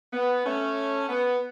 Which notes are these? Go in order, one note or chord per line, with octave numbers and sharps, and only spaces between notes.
B3
A3 C#4
B3